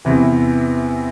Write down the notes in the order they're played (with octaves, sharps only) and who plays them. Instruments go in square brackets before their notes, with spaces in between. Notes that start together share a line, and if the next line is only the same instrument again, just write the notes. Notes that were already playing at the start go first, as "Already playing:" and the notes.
[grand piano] E2 C3 E3